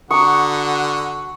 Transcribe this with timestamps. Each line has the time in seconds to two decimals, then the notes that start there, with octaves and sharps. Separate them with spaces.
0.11 D3 F#4 F#5 A#5 C#6 D#6